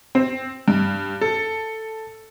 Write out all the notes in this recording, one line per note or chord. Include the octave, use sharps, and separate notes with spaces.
C4
G2
A4